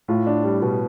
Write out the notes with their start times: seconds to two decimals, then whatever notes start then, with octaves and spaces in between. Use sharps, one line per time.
0.08 A2 F4
0.26 D4
0.44 G3
0.62 B2